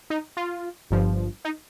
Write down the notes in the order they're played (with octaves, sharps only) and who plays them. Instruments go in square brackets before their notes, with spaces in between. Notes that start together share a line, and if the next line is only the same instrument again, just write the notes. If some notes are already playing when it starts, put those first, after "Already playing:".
[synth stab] D#4
F4
G1 G2 F3
D#4